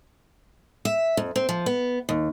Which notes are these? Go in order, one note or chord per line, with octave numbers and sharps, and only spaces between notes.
E5
F2
C4
F3
B3
D#2